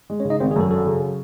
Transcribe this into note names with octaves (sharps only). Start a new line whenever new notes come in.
G#3
C#4 C#5
C#3
D#4 D#5
G#1 C4 C5
G#4
F#2 A4
F#3 A4
C#3